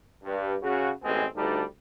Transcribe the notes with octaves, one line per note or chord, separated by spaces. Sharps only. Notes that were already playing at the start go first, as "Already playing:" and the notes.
G2
C#3 F#4
A1 B2 G#3 C4 D#5 G#5
D2 G2 G3 D4 D#4 A5